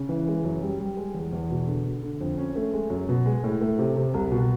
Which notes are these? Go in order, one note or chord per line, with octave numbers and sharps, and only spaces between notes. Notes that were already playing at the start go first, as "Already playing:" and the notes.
Already playing: C#3
E3
G#3
F#2
G3
G3
G#3
E2
E2
B2
D3
D3
D3
F2
C#4
A3
G#3
F#2
B2
G#3
A2
A3
C3
C3
C2
B2